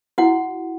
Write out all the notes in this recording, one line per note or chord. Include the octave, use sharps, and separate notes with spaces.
E4 F#4 F#5